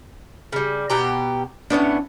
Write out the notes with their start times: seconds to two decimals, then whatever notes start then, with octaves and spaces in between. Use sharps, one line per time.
0.52 C#3 G3
0.90 B2 G4 A#5
1.70 A2 B3 C#4 D4 C#5